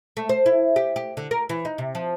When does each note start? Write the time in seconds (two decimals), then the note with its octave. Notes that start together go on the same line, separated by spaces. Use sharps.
0.17 A3
0.29 C5
0.46 E4
0.76 G4
0.96 G4
1.17 D3
1.31 A#4
1.49 E3
1.65 D#4
1.78 C3
1.95 F3